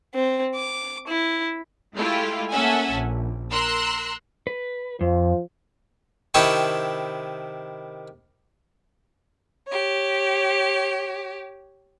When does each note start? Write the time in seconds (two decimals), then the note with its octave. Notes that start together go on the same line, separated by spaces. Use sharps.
0.15 C4
0.55 D6
1.07 E4
1.95 G#3 A3 E4 F4 G4
2.51 A#3 C#4 A4 E5 F#5 G#5
2.92 A#1
3.50 A#4 C6 E6 F#6
4.47 B4
5.01 F2 F3
6.34 C3 D#3 E4 G5 A5 C#6
9.67 G4 C#5